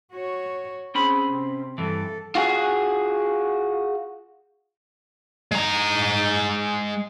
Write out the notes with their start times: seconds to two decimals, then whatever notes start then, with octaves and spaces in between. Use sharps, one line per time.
0.13 F#4 C#5
0.95 C4 C#4 G#4 B5
1.30 C3
1.78 G2 E3 A4
2.35 F4 F#4 G#4
5.52 G#3 A#5